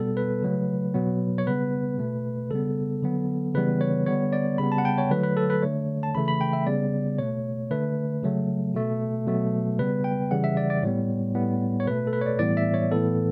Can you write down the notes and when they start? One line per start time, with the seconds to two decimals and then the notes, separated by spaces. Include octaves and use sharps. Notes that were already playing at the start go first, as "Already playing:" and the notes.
Already playing: B2 G3 B3 A4
0.17 B4
0.43 C#3 F#3 A3
0.94 B2 F#3 B3
1.38 C#5
1.47 C#3 G3 B3 B4
1.98 B2 A3
2.50 C#3 G3 B3 A4
3.03 D3 F#3 B3
3.55 C#3 E3 G3 B3 B4
3.81 C#5
4.06 D3 G3 B3 C#5
4.33 D5
4.58 C#3 G3 B3 B5
4.72 A5
4.78 F#5
4.85 G5
4.98 C#5
5.10 D3 F#3 A3 B4
5.23 B4
5.37 A4
5.50 B4
5.62 D3 A3 C#5
6.03 A5
6.15 C#3 E3 A3 B5
6.28 B5
6.41 G5
6.53 E5
6.66 C#3 G3 B3 D5
7.19 B2 A3 C#5
7.70 D3 A3 B4
8.23 C#3 F#3 A3
8.75 B2 A3
9.27 B2 F#3 A3
9.79 C#3 G3 B3 B4
10.04 G5
10.31 C#3 E3 G3 F#5
10.44 E5
10.57 D5
10.70 D5
10.83 A2 G3 B3 C#5
11.35 A2 G3 B3
11.80 C#5
11.87 B2 A3 B4
12.07 A4
12.13 B4
12.21 C#5
12.26 D5
12.39 A2 E3 G3 B3 D5
12.57 E5
12.74 C#5
12.91 A2 E3 B3 A4